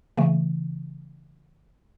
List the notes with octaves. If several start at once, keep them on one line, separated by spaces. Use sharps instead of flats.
C#3 E3 A3